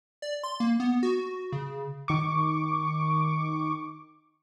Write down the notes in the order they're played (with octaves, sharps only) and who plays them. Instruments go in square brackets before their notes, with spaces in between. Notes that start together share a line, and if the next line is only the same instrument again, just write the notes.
[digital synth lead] D5
C6
A#3
B3
F#4
C#3
[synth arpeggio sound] D#3 C#6 D6